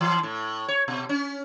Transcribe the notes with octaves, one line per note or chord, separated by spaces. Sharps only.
E3
A2
C#5
B2
C#4